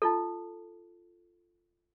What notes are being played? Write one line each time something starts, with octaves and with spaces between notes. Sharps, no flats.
D#4 F4 A4